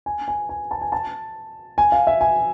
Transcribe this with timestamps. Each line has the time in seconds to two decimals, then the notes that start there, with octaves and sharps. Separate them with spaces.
0.06 G#5
0.28 G#5
0.49 G#5
0.71 A5
0.81 G#5
0.92 A5
1.78 G#5
1.92 F5
2.07 E5
2.21 G#5